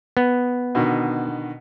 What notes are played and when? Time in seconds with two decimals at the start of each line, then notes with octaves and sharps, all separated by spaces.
0.17 B3
0.75 B2 D3 D#3